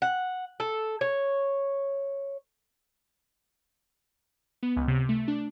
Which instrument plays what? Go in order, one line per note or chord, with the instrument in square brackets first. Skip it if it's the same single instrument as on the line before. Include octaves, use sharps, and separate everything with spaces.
[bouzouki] F#5
A4
C#5
[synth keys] B3
C#2
C3
A3
D4